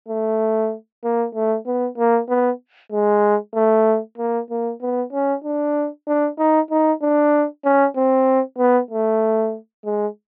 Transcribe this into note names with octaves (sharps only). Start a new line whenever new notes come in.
A3
A#3
A3
B3
A#3
B3
G#3
A3
A#3
A#3
B3
C#4
D4
D4
D#4
D#4
D4
C#4
C4
B3
A3
G#3